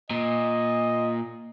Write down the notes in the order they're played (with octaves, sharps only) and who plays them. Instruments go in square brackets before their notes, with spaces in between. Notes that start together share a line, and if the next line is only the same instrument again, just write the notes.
[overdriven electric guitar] A#2 [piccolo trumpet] D#5